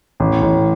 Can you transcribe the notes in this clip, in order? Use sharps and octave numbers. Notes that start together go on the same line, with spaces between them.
A1
A1